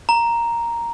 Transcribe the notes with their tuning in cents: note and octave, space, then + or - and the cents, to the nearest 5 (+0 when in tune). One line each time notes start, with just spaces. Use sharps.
A#5 +0